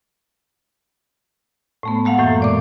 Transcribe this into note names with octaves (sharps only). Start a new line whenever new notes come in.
A2 A3 B3
G#3 A#3 F5 F#5
F#2 A2 E3
A#2 D5 D6